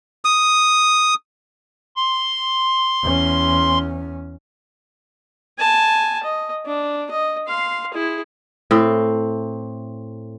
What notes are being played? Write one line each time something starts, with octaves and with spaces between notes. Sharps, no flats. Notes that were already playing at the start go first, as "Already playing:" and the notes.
D#6
C6
E2 C#4
G#5 A5
D#5
D4
D#5
F5 C6
E4 G#4
A2 C4